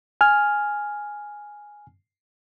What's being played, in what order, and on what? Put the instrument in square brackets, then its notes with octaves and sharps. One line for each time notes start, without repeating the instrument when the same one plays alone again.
[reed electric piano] G#5 F6